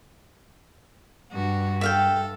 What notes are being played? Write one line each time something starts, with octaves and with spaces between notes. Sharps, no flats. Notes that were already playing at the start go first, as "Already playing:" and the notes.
G2 F#4
A4 E5 F5 G5